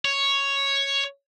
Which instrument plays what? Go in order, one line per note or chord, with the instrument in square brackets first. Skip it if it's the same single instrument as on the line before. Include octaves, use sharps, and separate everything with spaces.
[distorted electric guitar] C#5